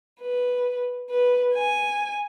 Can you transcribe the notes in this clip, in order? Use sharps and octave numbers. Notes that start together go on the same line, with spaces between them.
B4
B4
G#5